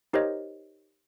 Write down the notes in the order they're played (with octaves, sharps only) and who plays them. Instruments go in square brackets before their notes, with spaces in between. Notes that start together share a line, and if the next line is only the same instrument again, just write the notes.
[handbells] D#4 G4 A#4 C5 C#5 D#5